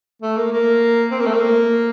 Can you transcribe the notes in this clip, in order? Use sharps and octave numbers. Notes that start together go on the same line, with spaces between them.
A3
A#3
A#3
C4
A#3
A3
A#3